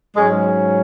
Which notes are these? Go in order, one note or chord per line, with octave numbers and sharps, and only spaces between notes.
G#2 F#3 G#3 C#4 G#4